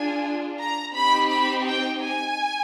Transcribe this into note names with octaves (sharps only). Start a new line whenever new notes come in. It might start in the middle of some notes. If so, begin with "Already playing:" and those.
Already playing: D4 F4 G#4 G#5
A#5
C4 D#4 G4 B5
B5
G5
G#5